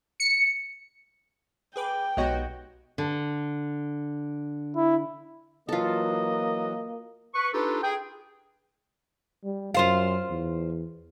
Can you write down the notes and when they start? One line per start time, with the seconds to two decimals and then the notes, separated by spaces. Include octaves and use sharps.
0.20 C#7
1.76 G#4 B4 G5 D6
2.17 B1 G#3 B3 F#4 G4 C#5 D#5
2.98 D3
4.76 E4
5.69 E3 F#3 A#3 F4 A4 D#5
7.34 B4 C#6
7.53 D4 D#4 F4 G4 A4 B4
7.82 G#4 G5
9.44 G3
9.74 F#2 F4 C5 F5
10.30 E2